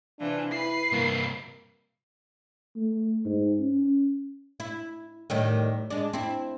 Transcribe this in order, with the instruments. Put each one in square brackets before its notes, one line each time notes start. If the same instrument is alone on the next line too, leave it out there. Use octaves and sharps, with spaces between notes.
[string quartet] C3 E3 F4 [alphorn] D4
[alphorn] E4 [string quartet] B4 B5 [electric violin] C7
[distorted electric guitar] G2 C3 [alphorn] A#3
[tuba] A3
G#2
C#4
[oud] E4
A2 D#3 G3
G#3 D4
C4 E4